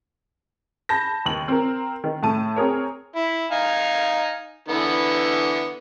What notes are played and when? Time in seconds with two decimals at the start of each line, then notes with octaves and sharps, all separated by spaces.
0.89 A5 B5 G6 A#6
1.26 D#2 F#7
1.48 C4 A#4
2.04 D#3
2.23 A2 A3 A5 D#7
2.56 C4 G#4 A#4 C#5
3.16 E4
3.52 D#4 F5 G#5
4.69 D3 E3 B3